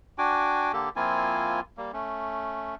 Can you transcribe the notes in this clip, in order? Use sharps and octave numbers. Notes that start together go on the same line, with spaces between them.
D4 F#4 G5 G#5 D6
D3 A#3 G4 A4
F3 A#3 C4 E4 F4 G#5
G3 A#3
A3 C#4